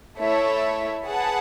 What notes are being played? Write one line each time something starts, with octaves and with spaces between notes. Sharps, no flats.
A3 E4 A4 C#5 E5
G#4 B4 F#5 A5